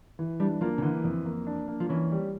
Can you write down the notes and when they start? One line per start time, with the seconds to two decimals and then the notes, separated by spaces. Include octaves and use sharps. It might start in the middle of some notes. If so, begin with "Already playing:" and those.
0.19 E3
0.40 G3 D4
0.61 F3 A#3
0.78 C#3
0.82 D3 E3
1.04 F2
1.25 A#3
1.47 D4
1.68 A#3
1.80 F3
1.89 E3 C#4
2.12 G3